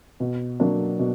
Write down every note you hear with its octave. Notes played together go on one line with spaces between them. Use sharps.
B2
F#3 A#3 D4
B2